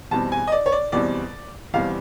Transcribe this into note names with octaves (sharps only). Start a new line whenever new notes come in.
E2 B2 G3 C4 A5
G#5
D#5
D5
C#5
D5
E2 B2 G3 C4 D5
E2 B2 G3 C4 F5